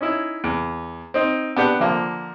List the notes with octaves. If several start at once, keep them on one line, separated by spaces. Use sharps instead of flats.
C#4 D#4 E4
E2
C4 D#4
B3 D4 G4 F#5
D3 F3 A#3